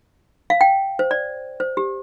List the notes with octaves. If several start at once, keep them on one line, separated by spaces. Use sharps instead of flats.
F5
G5
C5
D5
C5
G4